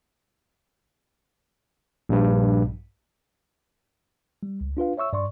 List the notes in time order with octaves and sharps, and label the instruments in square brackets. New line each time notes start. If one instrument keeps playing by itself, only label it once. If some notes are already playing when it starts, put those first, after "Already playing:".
[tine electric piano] A#1 G2
G3
C#2
D4 F4 B4 F5
C#5 E5 C#6 E6
G2 D5 C6 C#6